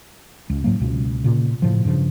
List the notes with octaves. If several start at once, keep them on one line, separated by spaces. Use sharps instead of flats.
C#2
G#2 F#3 A#3
C#2 B2
A#2 C#3
A2 C#3 F3
G2 C#3 F3